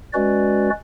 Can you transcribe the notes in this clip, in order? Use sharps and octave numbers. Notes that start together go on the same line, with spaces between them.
G#3 C#4 F#4 B4 D5